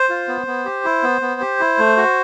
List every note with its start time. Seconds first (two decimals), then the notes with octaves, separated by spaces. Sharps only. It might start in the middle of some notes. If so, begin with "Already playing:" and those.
Already playing: C5
0.09 F4
0.28 B3
0.47 B3
0.65 G4
0.85 E4
1.03 B3
1.22 B3
1.41 G4
1.60 E4
1.79 A3
1.97 F#4